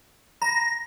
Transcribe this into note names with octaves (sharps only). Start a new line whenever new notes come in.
A#5 B5 A#6